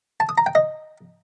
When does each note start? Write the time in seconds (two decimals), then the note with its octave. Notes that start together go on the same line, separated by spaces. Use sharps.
0.20 A5
0.29 D#6
0.38 A#5
0.46 G5
0.55 D#5